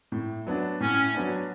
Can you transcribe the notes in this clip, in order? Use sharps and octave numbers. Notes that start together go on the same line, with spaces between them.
A2
F#3 B3 D4
A2 C#4
F#3 B3 D4